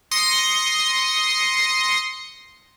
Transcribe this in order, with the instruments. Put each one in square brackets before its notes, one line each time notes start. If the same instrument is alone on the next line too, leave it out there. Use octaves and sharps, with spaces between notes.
[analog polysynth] C6 D#6 A#6 C7 C#7